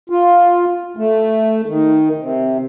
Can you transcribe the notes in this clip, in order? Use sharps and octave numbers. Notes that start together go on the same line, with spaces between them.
F4
A3
D#3
C3